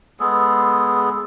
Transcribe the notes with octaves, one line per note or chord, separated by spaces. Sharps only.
G#3 B3 G#4 A4